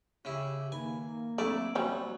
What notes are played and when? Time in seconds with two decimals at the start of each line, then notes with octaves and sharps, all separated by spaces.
0.25 C#3 E4 G4
0.72 D#3 A#3 D#4 G#5 B5
1.38 F#3 A3 C4 D4 E4 D5
1.75 F#3 G3 C#4 F#4 C5 B5